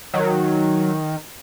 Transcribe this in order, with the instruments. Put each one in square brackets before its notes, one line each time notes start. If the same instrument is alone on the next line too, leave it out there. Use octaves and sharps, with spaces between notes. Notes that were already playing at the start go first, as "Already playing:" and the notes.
[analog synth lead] D#3 [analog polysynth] F#3